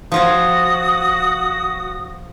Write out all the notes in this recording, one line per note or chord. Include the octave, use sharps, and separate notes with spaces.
F3 F4 F#4 C#5 D#6